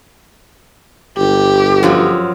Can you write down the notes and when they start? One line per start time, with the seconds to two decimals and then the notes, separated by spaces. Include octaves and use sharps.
1.17 G1 G4
1.83 F#2 F3 F#3